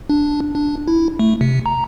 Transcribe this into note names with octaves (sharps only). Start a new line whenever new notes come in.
D4
D4
E4
A3
C3
A#5